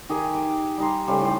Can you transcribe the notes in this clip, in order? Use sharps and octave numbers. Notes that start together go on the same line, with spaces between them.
D#3 G4 G#4
D6
G3 D#4 C6
C#3 G3 A3 C5
A2 C5